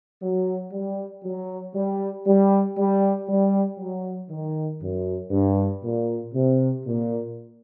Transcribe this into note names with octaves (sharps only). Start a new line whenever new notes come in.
F#3
G3
F#3
G3
G3
G3
G3
F#3
D#3
F#2
G2
A#2
C3
A#2